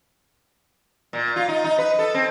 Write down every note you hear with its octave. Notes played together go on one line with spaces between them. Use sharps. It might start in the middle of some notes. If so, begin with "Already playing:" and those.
A#2
F4
D#4
D#4
B4
A4
C4